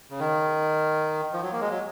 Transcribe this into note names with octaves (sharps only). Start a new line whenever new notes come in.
C#3
D#3
F3
F#3
A#3
G#3
F#3